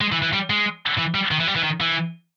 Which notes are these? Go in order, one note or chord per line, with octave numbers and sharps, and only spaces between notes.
G#3
E3
E3
G3
G#3
E3
G3
D#3
E3
G3
E3
D#3
E3